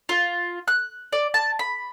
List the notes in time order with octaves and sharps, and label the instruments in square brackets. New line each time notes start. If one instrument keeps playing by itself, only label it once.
[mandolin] F4
F#6
D5
A5
B5